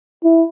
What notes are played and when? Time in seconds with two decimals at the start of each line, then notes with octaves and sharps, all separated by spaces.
0.24 E4